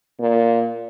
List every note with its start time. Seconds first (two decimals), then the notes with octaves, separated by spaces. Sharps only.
0.20 A#2